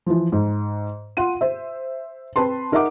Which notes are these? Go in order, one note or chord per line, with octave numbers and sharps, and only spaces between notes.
E3 F3
G#2
F4 F#5 D#7
C5 E5
C4 B4 A5 C6
D#4 A#4 D#5 E5 F#5 D6